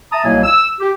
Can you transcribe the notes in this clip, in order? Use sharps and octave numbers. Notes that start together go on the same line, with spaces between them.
E5 A5 A#5 D#6
C2 B2 F#3 A#3 E4 G#5
E6
G4